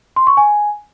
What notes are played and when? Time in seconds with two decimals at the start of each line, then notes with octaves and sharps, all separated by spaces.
0.16 C6
0.27 C#6
0.37 G#5